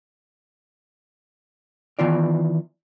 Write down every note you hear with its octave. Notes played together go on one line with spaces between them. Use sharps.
D#3 E3 B3 F4 D5